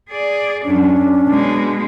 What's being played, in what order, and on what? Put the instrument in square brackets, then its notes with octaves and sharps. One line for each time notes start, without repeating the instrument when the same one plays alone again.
[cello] G#4 D5
[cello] F#2 F#3 [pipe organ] C#4 [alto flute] D4
[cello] B2 G#3